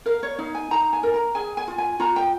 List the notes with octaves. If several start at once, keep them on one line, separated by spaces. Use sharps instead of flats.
A#4 F5
C#5
D#4 F5
G#5
D#4 A#5
G#5
A#4
A#5
G#4 G#5
G#5
F4
G#5
F4 A#5
G5